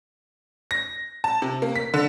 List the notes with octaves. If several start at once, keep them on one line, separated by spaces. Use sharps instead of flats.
A#6
A5
C3
A#3
B6
D3